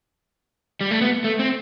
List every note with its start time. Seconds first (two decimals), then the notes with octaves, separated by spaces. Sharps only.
0.81 G3
0.91 A3
1.01 B3
1.24 A3
1.39 C4